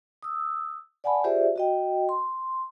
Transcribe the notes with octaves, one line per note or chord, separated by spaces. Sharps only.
D#6 E6
D5 F#5 G#5 A5 B5
F4 G4 G#4 C5 D5 E5
F#4 D#5 G5
C6